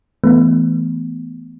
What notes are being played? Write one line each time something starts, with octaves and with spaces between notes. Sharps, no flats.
E3 A3 B3